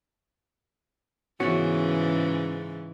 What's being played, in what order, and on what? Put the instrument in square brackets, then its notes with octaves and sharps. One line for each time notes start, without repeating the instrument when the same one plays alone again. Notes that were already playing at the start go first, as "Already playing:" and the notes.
[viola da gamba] G#2 C#3 E3 [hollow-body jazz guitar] B3 C#4 F#4